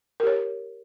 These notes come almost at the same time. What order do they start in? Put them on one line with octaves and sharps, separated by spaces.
A#4 G4 C#5